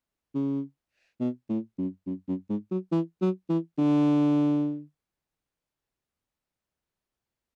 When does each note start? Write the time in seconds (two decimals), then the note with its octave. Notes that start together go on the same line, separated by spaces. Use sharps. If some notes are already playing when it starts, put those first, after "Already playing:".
0.35 C#3
1.20 B2
1.50 A2
1.79 F#2
2.07 F#2
2.28 F#2
2.50 G#2
2.71 F#3
2.92 E3
3.21 F#3
3.49 E3
3.78 D3